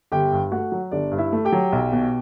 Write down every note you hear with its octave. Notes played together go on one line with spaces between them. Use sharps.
G1 G4 G5
G2
A3 F#4 F#5
F#3
G1 D4 D5
G2
E4 E5
A3
G4 G5
F#3
B1
B2